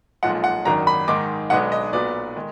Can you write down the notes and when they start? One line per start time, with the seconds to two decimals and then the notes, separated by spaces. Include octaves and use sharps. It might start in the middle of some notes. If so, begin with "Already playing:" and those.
0.23 B1 A#2 F3 G#3 F#5
0.44 F#5
0.65 G#1 F#2 D#3 F#3 D4 A#5
0.87 B5
1.08 G#2 D#3 G#3 D#4 D6
1.50 B1 B2 G#3 B3 D4 F#5
1.72 D#5
1.93 B1 A#2 F#3 B3 D5
2.36 D#3 G#3